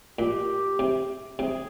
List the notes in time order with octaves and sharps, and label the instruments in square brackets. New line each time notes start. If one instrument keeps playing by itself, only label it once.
[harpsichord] A#2 [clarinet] G4
[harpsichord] C3
[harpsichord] C3 [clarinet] G#4